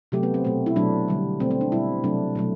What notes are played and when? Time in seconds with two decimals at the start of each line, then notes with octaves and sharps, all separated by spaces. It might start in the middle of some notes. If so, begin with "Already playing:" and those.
0.12 C3 F#3 A3 G4
0.23 B3
0.34 C4
0.44 B2 A3
0.66 E4
0.76 B2 F#3 A3 D4
1.08 D3 G3
1.40 B2 A3 C4
1.51 C4
1.61 D4
1.72 B2 G3 E4
2.04 C3 F#3 A3 D4
2.35 B2 F#3 A3